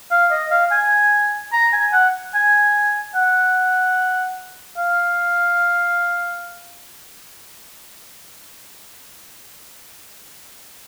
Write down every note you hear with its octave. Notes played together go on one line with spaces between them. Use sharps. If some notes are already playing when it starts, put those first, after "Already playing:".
F5
D#5
F5
G#5
A#5
G#5
F#5
G#5
F#5
F5